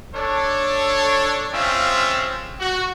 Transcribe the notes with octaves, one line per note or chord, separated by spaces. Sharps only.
D4 A4 C#5
G#3 C4 C#4 F4 E5 F5
F#4